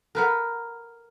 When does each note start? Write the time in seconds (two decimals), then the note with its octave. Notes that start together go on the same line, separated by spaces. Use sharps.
0.15 A#4 B4 F#5